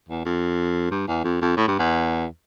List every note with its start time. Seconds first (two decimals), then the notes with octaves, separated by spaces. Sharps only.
0.09 E2
0.25 F2
0.91 G2
1.08 E2
1.24 F2
1.41 F2
1.57 A2
1.68 G2
1.79 E2